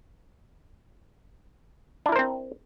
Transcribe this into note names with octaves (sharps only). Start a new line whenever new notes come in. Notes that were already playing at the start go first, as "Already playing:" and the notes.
C4 D4 E4 A#4 C5